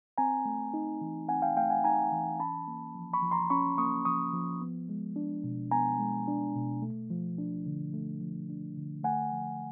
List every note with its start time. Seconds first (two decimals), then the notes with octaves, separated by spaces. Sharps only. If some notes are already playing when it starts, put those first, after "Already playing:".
0.18 C4 G#5 A#5
0.45 A3
0.74 D#4
1.01 E3
1.29 C4 F#5 G#5
1.42 F5 G5
1.57 A3 F5 G5
1.70 F#5 G#5
1.84 D#4 G#5 A#5
2.12 E3
2.40 C#4 A5 B5
2.68 A#3
2.95 F3
3.13 B5 C#6
3.22 F3
3.31 A#5 C6
3.50 C#4 B5 C#6
3.78 A#3 C#6 D#6
4.05 F3 C#6 D#6
4.33 F3
4.62 B3
4.89 G#3
5.16 D4
5.44 B2
5.71 B3 G#5 A#5
5.99 G#3
6.27 D4
6.55 B2
6.82 A3
7.10 F3
7.38 D4
7.66 D3
7.93 A3
8.21 F3
8.49 D4
8.77 D3
9.04 A3 F#5 G#5
9.32 F3